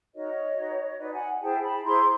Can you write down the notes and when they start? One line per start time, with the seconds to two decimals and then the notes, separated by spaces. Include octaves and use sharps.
0.14 D#4 F#4 A#4 C#5 D#5
0.56 D#4 F#4 B4
0.87 D#5
0.99 D#4 F#4 B4 D5
1.12 F#5 G#5
1.41 E4 G#4 C5 G5 A5
1.62 A5 B5
1.83 E4 G#4 C5 A#5 C6